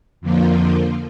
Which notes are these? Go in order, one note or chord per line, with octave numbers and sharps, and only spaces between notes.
F2 D3 F3 A#3 F4